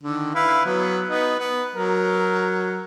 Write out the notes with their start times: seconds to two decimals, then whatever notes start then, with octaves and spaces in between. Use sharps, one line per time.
0.03 D3 D#3
0.35 E4 B4 F5
0.65 F#3 B3
1.08 B3 D#4
1.39 B3
1.75 F#3 A#4